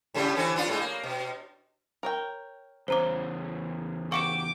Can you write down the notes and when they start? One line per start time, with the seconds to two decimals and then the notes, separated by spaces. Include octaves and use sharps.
0.14 A2 C#3 G3
0.35 D3 E3 C4
0.56 B3 D4 F4
0.68 A2 G#3
0.79 A#3
1.03 B2
2.03 A#4 C#5 G5
2.88 E2 C#3 C#4 C5 A#5 D6
4.12 F#4 G4 C#6 D6 C#7 E7